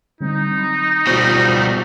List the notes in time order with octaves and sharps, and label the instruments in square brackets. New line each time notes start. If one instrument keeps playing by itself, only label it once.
[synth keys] D3 G3 C4 [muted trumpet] D#4
[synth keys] F#3 A#5 B5
[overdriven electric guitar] B2 G3 [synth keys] F4 F#4 C5